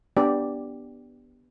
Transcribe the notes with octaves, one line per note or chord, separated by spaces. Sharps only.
B3 D4 G4 D5